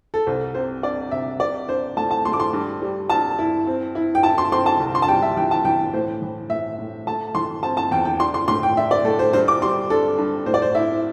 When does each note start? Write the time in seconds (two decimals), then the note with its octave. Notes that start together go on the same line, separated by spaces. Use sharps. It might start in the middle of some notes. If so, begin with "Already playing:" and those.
0.14 A4
0.26 C2 C5
0.55 C3 C5
0.83 D4 D5
1.11 C2 E5
1.40 C3 D5
1.68 D4 C5
1.97 A3 A5
2.11 A5
2.25 A3 C6
2.33 D6
2.40 C6
2.53 G2
2.82 G3
3.10 G2 A5
3.39 E4
3.67 C4
3.95 E4
4.15 G5
4.23 E4 A5
4.38 C6
4.52 C4 C6
4.66 A5
4.80 C2
4.95 C6
5.02 A5
5.08 G3 G5
5.22 E5
5.37 E3 G5
5.51 A5
5.65 E3 G5
5.94 A2 C5
6.22 E3
6.49 A2 E5
6.79 A2
7.07 A3 A5
7.35 E3 C6
7.63 C4 A5
7.77 A5
7.91 E2 G5
8.05 G5
8.20 D4 C6
8.34 C6
8.48 A2 C6
8.63 G5
8.77 D4 E5
8.91 D5
9.05 A2 A4
9.19 C5
9.33 G2 C5
9.48 D6
9.62 G3 C6
9.90 D4 A4
10.18 G2
10.46 A2 C5
10.54 D5
10.62 C5
10.75 E4 E5